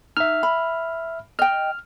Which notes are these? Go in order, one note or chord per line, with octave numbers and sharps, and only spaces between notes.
D#4 E5 F6
B5
D#5 G5 F6